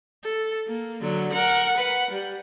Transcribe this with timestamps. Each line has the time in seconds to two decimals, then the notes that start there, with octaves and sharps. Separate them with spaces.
0.24 A4
0.67 A#3
1.02 D3 F#3
1.32 A#4 F#5
1.77 B4 F#5
2.10 G3